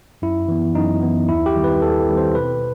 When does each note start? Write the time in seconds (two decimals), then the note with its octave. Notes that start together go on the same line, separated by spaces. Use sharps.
0.22 F#2 E4
0.48 E3 B3
0.75 F#2 D#4
1.03 E3 B3
1.28 D#2 E4
1.46 G4
1.56 D#3 G3 C4
1.64 B4
1.82 D#2 A4
2.09 D#3 G3 C4
2.18 C5
2.35 B2 B4